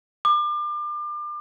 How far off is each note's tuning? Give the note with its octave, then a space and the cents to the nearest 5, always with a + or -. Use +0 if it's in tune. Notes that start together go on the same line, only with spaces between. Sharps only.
D6 +35